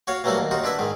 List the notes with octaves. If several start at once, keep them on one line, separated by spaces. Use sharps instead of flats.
F#4 C#5 F5
E3 F#3 G3 A3 A#3 F#4
D#2
D#4 F4 F#4
D4 E4 B4 E5
G#2 D#3